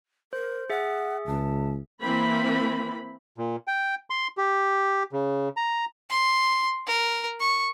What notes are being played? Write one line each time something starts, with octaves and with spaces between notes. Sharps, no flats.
A#4 C5
G#4 E5 F#5
C#2 A5
E3 A#3 C4 B5
A#2
G5
C6
G4
C#3
A#5
C6
A#4
C#6